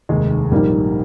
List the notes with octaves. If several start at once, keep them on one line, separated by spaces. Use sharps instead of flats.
F1 D#2 D#3 G#3
A#1 G#2 D#3 G3 A#3